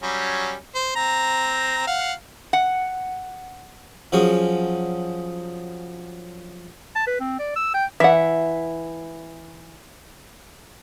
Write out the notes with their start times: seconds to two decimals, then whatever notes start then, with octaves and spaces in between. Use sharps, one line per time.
0.02 F#3 G3 C#4
0.75 C5
0.96 C4 A#5
1.87 F5 F#5
2.53 F#5
4.12 F3 F#3 C#4 G#4
6.96 A5
7.07 B4
7.20 C4
7.39 D5
7.56 E6
7.74 G5
8.00 E3 E5 F#5